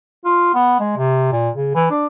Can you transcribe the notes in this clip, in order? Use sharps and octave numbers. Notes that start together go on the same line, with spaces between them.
F4
B3
G#3
C3
A#2
C#3
E3
D4